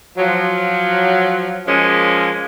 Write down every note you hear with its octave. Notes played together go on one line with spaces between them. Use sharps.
F3 F#3
F3 G#3 A#3 C#4